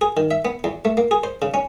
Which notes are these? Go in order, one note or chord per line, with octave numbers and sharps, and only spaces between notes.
G#4
D#3
E5
B3
E2
A3
A#3
G#4
C5
C#3
C#4